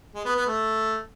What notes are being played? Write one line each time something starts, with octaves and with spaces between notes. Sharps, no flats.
G#3
B3
B3
A3